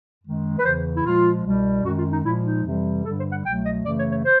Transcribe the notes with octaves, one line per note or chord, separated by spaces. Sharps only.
F#2 D#3 G#3
B4
E2 C#3 E3 C5
E4
A#2 F3 G#3 F4
C2 B2 G3
F#2 D#3 G#3 F#4
F4
D#4
A#2 F3 G#3 E4
D#4
F2 C3 E3 G3
G2 D3 G3 A4
C5
F#5
C2 B2 F#3 A3 G5
D#5
F#2 C#3 E3 A3 D5
C#5
C#5
C5